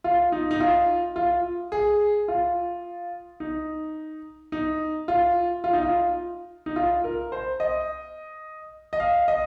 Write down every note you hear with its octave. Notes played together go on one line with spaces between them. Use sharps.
F4
D#4
D#4
F4
F4
G#4
F4
D#4
D#4
F4
F4
D#4
F4
D#4
F4
A#4
C5
D#5
D#5
F5
D#5